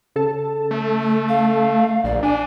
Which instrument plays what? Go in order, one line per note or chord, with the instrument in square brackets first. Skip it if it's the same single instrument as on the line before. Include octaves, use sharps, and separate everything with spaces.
[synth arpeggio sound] C#3 A4 A5
[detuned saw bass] A3
[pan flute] F5
[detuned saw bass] A#1 [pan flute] D5
[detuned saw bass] D4 [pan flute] G#5